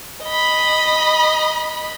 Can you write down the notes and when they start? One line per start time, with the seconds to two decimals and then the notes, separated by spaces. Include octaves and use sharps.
0.23 D#5 B5